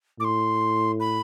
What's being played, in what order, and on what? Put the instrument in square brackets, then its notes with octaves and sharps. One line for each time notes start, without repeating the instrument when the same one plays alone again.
[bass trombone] A2 [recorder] D6
[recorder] C6
B5